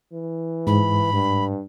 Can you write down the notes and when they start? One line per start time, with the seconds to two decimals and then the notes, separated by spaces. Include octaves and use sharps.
0.13 E3
0.67 G#2 B5
1.13 G2